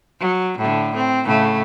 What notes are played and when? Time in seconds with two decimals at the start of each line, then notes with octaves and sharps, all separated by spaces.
0.20 F#3
0.58 A2 D3
0.95 C4
1.25 A2 C#3 A3